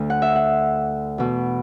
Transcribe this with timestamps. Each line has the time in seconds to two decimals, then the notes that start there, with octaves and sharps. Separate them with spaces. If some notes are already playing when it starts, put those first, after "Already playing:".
Already playing: D2 D3
0.10 F#5
0.22 E5
0.36 F#5
1.18 E2 B2